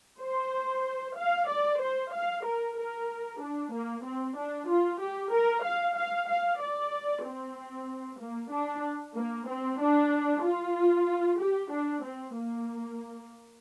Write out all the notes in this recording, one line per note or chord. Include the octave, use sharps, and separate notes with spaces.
C5
F5
D5
C5
F5
A#4
A#4
D4
A#3
C4
D4
F4
G4
A#4
F5
F5
F5
D5
C4
A#3
D4
A#3
C4
D4
F4
G4
D4
C4
A#3